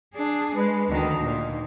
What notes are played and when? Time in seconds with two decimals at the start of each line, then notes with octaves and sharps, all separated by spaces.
0.15 D4 G#4
0.56 G#3 B4
0.91 D2 D#3 D#4
1.25 A#2